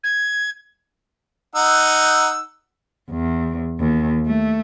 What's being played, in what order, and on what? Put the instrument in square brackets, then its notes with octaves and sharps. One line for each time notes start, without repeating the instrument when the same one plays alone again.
[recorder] G#6
[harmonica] D#4 F#5 E6
[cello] E2
D#2
A3